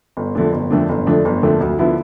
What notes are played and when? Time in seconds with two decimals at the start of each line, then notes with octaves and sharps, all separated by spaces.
0.17 G1
0.35 F2 D3 A3 D4
0.53 G1
0.71 F2 D3 A3 D4
0.89 G1
1.07 F2 D3 A3 D4
1.25 G1
1.43 F2 D3 A3 D4
1.61 D2
1.79 D3 F3 B3 E4